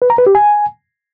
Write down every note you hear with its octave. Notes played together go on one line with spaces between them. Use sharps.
B4
A#5
B4
G4
G#5